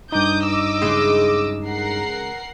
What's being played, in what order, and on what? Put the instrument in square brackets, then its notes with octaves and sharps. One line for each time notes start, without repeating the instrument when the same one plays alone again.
[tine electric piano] G2 D#4 [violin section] D6 D#6 G6
[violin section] D#5 D6 E6
[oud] C#3 G#3 E4
[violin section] A#4 F#5 C7